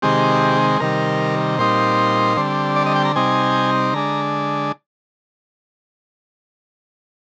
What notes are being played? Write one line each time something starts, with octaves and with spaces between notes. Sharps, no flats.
C3 D#3 G#3 C4 G4
C3 D#3 G3 A#4
A#2 G3 C4 D#4 C5
D3 G3 C4
D5
D#5
G5
A#5
C3 G3 C4 D#4 G#5
D3 G#3 D4 A#5